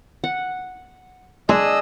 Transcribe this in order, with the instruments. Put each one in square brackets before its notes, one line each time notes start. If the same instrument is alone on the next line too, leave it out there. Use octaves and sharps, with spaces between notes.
[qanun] F#5
[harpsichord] G#3 [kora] D4 [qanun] G#4 [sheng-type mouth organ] D#5 E6